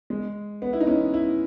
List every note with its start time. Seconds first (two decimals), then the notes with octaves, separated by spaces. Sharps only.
0.10 G#3
0.62 B3
0.73 E4
0.81 D#4
0.87 C#4
1.14 E4